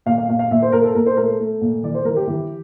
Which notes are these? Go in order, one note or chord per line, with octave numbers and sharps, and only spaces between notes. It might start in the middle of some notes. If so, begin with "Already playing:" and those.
A#2 F5
F5
A#2 F5
F5
A#2 E5
C5
A#2 A#4
A4
A#2 A#4
C5
A3 A#4
A3
A#2
E3 D5
C5
E3 A#4
G4
E3